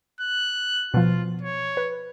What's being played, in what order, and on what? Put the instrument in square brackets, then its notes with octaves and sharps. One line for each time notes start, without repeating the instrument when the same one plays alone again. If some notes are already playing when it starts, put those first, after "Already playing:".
[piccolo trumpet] F#6
[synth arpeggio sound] B2 F3 [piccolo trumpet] F4
[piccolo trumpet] C#5
[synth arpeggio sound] B4